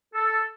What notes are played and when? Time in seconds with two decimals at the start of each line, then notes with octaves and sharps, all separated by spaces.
0.14 A4